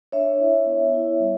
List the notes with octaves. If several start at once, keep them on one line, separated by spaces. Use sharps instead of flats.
D4 C#5 E5
E4
B3
E4
G3